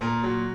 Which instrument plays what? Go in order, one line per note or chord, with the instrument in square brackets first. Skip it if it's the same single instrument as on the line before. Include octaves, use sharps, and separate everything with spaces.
[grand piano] A#2 A#4
F#3